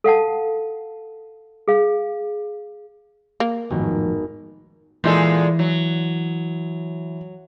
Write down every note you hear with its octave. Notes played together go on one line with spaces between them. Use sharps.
A4 F5 F#5 A5
G#4 F5
A#3
G#1 F2 A2 D#3 F3 F#3 B3
A#2 E3 G#3 A4
F#3